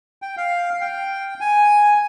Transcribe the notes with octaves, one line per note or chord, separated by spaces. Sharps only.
G5
F5
F5
G5
G#5